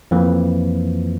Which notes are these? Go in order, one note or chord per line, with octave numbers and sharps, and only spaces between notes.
F2 E3 F3 A#3